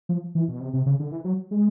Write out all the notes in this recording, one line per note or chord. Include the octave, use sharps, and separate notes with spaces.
F3
E3
B2
C3
C3
C#3
D3
E3
F#3
G#3